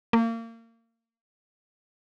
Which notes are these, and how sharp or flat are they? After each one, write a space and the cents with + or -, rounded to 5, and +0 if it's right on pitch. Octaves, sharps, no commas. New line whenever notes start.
A#3 -30